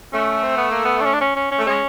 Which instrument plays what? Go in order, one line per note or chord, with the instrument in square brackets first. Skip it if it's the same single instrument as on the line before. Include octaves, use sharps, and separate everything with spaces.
[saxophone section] A3 [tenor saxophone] C#4
[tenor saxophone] C4
B3
A#3
B3
D4
C#4
D4
C#4
C#4
C#4
[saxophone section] A3
[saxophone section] G#3 [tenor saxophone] C#4